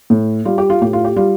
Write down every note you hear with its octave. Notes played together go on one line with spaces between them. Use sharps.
A2
G3 F4
G4
F4
A2 G4
F4
G4
G3 F4